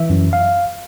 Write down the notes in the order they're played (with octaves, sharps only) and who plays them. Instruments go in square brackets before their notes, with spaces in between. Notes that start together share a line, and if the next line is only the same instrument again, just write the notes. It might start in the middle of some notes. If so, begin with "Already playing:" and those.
Already playing: [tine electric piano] E3 E5
F#2
F5